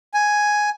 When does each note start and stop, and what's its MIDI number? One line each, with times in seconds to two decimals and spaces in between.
0.14 0.70 80